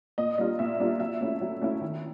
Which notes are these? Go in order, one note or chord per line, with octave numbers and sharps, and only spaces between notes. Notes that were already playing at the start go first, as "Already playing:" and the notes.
A#2 D#5
G3 A#3 D4 F4 D#5
A#2 E5
G3 A#3 D4 F4
F#3 E5
A3 C#4 E4
F#3
A3 C#4 E4
D#3